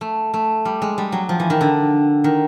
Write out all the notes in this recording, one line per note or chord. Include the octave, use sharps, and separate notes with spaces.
A3
A3
G3
G#3
G3
F#3
F3
E3
D#3
D3
D#3